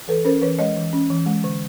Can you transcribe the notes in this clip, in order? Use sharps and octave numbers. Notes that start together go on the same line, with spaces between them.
E3 A4 B4
C#4 A#4 C5
E3 B4 C#5
G#3 C#5 D#5
E3
C#4
E3
G#3
D3